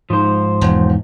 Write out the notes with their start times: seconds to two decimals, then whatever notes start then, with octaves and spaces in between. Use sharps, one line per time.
0.10 G#2 F3 C5
0.61 E1